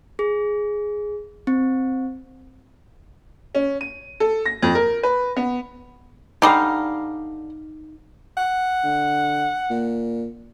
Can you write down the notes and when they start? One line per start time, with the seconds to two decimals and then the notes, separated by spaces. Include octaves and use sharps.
0.19 G#4
1.47 C4
3.55 C#4
3.81 D#7
4.20 A4
4.46 A#6
4.63 F2
4.75 A#4
5.03 B4
5.37 B3
6.42 D3 G3 D#4 F5 A#5
8.37 F#5
8.84 D3
9.70 A#2